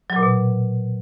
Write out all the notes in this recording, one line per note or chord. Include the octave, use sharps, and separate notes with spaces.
F#3
A#2
B2